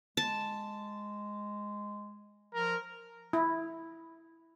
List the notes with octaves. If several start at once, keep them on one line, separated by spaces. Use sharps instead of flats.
G#3 A5
F3 A#4
E4